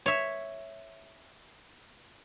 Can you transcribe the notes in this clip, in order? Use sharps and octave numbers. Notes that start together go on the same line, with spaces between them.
C#5 E5